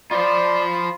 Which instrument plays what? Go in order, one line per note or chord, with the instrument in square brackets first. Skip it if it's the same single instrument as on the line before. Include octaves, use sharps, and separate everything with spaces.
[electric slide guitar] F4 C5 [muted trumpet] D5 [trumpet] B5